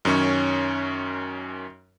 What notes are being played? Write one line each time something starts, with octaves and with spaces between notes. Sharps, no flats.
F#2 D#3 C#4 C#5 C#6